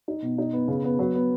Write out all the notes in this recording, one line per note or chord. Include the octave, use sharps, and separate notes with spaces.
D#4
B2
D#4
B3
C#3
B3
F#3
B3